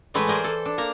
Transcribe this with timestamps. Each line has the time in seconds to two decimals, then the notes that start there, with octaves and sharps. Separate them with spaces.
0.14 A2 E3 G#3 A3 B4
0.27 G#4 A#4 C5 D5
0.44 A4
0.66 D4
0.78 A#3 A#5